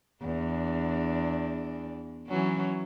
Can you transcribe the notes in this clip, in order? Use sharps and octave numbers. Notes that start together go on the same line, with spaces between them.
E2 D4
E3 F#3 C#4